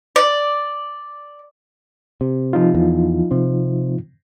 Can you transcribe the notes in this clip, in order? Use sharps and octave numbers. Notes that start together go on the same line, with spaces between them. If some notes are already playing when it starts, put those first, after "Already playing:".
D5
C3
F3 D#4 F4
E2
C3 C4